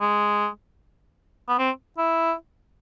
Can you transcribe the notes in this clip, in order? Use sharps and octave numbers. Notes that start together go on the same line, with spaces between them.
G#3
B3
C4
E4